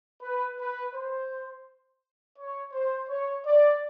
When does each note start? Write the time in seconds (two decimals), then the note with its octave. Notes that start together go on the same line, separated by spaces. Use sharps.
0.22 B4
0.58 B4
0.94 C5
2.37 C#5
2.72 C5
3.08 C#5
3.45 D5